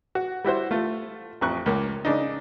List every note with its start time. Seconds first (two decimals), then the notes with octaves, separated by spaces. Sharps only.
0.15 F#4
0.44 G3 E4 F#4 C5
0.71 A3 F4
1.41 A1 F2 C#6 F#6
1.66 C#2 A#3
2.05 C#3 D4 D#4